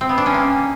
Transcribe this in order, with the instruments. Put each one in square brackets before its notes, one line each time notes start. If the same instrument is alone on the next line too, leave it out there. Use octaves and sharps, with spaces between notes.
[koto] C4
B3
D4
C#4
A#3